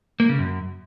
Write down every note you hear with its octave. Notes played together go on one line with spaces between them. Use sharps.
A#3
C#3
F#2